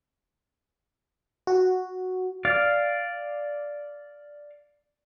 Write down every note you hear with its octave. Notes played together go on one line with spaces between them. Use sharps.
F#4
D5 F5